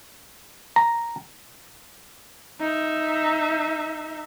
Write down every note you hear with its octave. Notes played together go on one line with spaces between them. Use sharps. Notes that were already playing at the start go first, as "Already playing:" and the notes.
A#5
D#4 E5